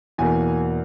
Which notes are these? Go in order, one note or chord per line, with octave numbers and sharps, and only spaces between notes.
E2 B2 A#3 G#5